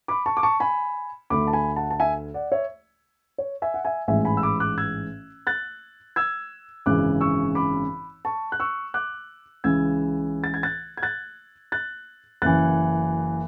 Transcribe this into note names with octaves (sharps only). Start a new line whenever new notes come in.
B5 D6
A5 C#6
D6
A5 C#6
G#5 B5
D2 D3 B5 D6
A5
G#5 B5
F#5 A5
A5
E5 G#5
D5 F#5
C#5 E5
C#5
E5 G#5
F#5
E5 G#5
A1 G#2 E3 E5 G#5
G#5 B5
E6
B5 D6
D6 F#6
E6 G#6
F#6 A6
E6 G#6
G#1 F#2 C#3 E3 D6 F#6
C#6 E6
B5 D6
A5 C#6
F#6
C#6 E6
D6 F#6
C#2 C#3 E3 E6 G#6
A6
G#6
F#6 A6
G#6
F#6 A6
F#6 A6
F#1 F#2 E3 F#6 A6